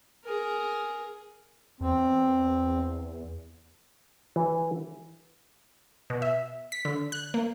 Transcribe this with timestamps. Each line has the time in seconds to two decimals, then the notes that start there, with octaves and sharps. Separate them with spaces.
0.24 G#4 A#4
1.81 E2 C4
4.36 E3
6.10 B2
6.22 E5
6.72 B6
6.85 D3
7.12 F#6
7.34 A#3